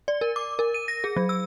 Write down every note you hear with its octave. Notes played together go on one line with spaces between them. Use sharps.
D5
A#4
D6
A#4
D#7
A#6
G#4
F#3
E6